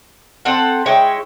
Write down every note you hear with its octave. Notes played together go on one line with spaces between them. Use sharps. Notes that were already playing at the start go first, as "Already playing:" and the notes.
C4 A4 F#5
G#3 E4 C#5 G5